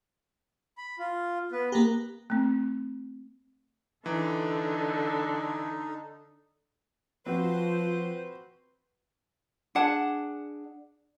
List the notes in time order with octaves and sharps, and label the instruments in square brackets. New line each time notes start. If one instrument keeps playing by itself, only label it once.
[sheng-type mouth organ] B5
F4
B3 B4
[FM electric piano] A#3 G4 [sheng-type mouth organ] A#5 F#6
[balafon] A3 C4
[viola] D3 [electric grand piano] E3 [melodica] D#4 [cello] A4
[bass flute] F3 [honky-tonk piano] C4 F#4 [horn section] B4 C5
[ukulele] D4 G#4 F#5 A5